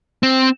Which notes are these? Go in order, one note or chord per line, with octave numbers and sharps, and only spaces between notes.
C4